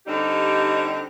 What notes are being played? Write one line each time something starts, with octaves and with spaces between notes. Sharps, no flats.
D3 G3 C4 D#4 G4